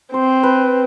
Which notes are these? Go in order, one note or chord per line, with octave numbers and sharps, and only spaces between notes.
C4 C5
B4